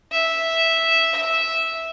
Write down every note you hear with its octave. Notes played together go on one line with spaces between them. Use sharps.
E5
E5